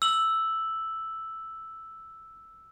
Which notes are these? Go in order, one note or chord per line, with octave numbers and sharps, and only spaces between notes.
E6 F#7